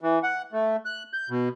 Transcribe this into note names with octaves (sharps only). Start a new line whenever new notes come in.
E3
F#5
A3
F#6
G6
B2